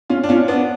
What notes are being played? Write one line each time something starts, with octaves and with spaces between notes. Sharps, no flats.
C#4 F4
D4
C#4 F4
B3 D4